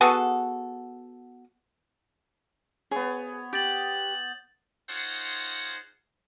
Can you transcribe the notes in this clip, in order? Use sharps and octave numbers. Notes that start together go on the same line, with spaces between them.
B3 F#4 G#4 A4
B3 G#4 C#5
G4 G6 A6 F#7
D#4 F4 G#4 C5 C#5 F#5